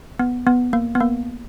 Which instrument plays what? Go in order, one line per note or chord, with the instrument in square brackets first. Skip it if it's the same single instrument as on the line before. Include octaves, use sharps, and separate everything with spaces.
[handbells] B3
B3
A#3
B3
A#3